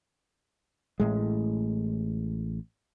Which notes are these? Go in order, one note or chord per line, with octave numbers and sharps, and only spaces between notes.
A1 A2 G#3